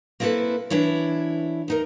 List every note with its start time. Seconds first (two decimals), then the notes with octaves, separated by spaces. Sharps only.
0.20 A#3 C4 D#4 E4 A4 B4
0.70 E3 D4 E4 C#5
1.68 E2 D#4 A#4